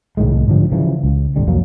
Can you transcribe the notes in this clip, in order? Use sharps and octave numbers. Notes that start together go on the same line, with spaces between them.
C2 A2 D#3 G#3
G#2 D3 F3 G3
C#3 E3 F3 G3
C#2
D#1 G#1 D3 G3
C2 F2 F#3 A#3